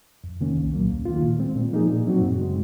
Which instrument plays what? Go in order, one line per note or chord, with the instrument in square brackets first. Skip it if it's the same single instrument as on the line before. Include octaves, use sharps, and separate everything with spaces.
[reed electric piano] F2
C3 D#3 A#3 C#4
C2
A#2 F#3 A#3
D#2
D#3 A#3 F4
A#2
G#3 C4
A#2
F3 A#3 D#4 G#4
A#2
F#3 C4 D#4 F#4
F#2
C#3 G#3